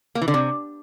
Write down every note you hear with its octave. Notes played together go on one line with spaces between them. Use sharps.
A#3
E3
D3
C3